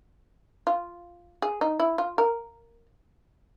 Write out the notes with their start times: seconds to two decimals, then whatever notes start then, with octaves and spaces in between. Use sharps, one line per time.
0.67 F4
1.42 G#4
1.61 D#4
1.80 E4
1.98 F4
2.18 A#4